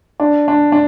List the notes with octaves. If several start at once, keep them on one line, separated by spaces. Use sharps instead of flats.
D4
D4
D4